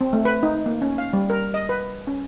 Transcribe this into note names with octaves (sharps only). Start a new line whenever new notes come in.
C4
A3
B4
D#4
A#3
C#4
F5
G3
A#4
D#5
B4
C#4